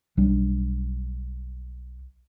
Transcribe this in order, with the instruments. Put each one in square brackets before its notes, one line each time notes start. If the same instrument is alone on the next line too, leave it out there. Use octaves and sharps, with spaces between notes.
[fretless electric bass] B1 G3 C#4 D4